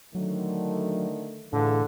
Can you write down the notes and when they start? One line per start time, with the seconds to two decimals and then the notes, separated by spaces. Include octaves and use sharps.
0.15 D3 D#3 F#3 A3
1.53 A2 D3 E3 F4 G#4